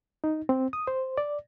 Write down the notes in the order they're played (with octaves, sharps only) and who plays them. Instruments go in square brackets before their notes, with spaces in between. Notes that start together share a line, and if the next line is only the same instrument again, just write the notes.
[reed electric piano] D#4
C4
D#6
C5
D5